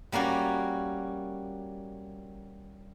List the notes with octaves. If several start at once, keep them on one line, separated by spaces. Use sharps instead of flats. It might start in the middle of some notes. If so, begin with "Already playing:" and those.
G3 A#3 C#4 F#4